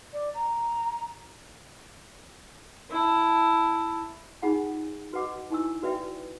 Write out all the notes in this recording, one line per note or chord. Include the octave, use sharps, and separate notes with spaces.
D5
A#5
E4 A5
D#4 F4 G#4 F#5 G#5
F#4 B4 D#5 F#5 D6
D#4 E4 G#5 C#6 E6
F#4 B4 D5 E5 G5